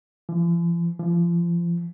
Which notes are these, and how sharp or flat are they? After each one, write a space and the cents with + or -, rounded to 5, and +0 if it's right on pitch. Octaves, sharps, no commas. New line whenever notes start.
F3 -45
F3 -30